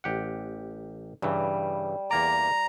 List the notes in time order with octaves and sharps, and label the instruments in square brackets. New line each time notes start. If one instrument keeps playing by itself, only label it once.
[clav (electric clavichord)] A1 G4 F#5
[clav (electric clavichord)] G2 C#3 E3 [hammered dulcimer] G3
[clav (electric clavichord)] E2 A#3 D5 [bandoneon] A#5